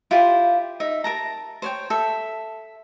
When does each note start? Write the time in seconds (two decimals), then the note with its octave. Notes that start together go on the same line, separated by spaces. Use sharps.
0.11 E4 F4 G4 C5
0.80 D#4 E5
1.04 A#4 A5 A#5
1.62 C5 C#5 G5
1.90 A4 E5